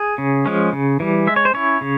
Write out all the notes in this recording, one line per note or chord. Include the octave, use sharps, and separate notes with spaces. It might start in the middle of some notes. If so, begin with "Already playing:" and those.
Already playing: G#4
C#3
F3 G#3 C#4
C#3
E3 G3
G#3 E5
C#5
C5
C#4 E4 C#5
C#3